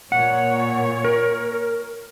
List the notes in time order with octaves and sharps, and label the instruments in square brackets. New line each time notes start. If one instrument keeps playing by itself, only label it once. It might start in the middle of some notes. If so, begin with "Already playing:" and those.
[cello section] A#2 C#5 [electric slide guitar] F#5
[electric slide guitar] A#4